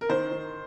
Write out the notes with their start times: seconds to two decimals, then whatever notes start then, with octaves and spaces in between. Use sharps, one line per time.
0.01 A#4
0.09 D#3 C5
0.31 D#3